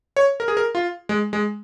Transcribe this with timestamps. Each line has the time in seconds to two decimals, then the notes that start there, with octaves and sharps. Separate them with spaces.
0.17 C#5
0.40 A#4
0.48 G#4
0.57 A#4
0.75 F4
1.09 G#3
1.33 G#3